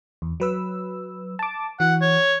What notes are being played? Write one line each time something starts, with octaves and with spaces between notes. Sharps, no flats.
E2
F#3 B4 E6
A5 D6
E3 F#4 F#5
C#5